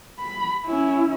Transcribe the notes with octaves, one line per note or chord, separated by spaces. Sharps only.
B5
C#4 E4